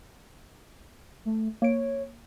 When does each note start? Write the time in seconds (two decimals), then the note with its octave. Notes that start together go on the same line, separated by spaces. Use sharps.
1.25 A3
1.62 A#3 C#5 D7